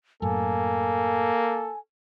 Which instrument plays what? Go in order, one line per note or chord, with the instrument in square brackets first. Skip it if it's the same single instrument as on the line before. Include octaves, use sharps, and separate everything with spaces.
[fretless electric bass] F#2 A2 [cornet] A#3 [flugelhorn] A4 [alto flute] G#5